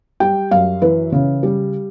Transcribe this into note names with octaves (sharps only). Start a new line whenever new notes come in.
G3 G5
F#2 F5
E3 B4
C#3
G3